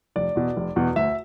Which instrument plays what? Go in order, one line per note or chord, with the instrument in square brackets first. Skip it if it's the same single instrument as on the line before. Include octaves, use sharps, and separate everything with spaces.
[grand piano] F1 D5
E2 B2
F1
E2 B2
D2 E5